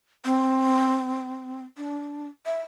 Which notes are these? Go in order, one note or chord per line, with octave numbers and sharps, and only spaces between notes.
C4
D4
E5